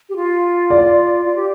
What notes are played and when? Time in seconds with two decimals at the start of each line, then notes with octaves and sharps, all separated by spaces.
0.09 G4
0.16 F4
0.70 D5
1.25 F4
1.35 G4